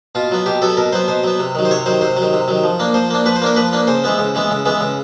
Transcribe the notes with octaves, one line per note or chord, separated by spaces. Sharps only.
B2 F4
F#3 B3
B2 G4
F#3 B3 A4
B2 A#4
F#3 B3 C5
B2 C5
F#3 B3
C3
D#3 F#3
C5
C3 C#5
D#3 F#3 C5
C3 C5
F#3
D#3
C3
D#3 F#3
F3
A#3 D4
F3 C5
A#3 D4
F3 B4
C5
A#3 D4 A#4
F3 B4
A#3 D4
C#3 C5
E3 G#3 B3
C#3
E3 G#3 B3
C#3
E3 G#3 B3
C#3